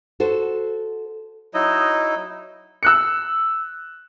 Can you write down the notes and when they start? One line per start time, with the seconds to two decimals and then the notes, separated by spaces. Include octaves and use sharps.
0.20 F#4 A4 C5
1.54 F#3 D#4 E4 D#5
2.83 E6 F#6 C#7